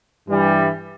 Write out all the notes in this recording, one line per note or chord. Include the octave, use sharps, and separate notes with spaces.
G2 E3 G3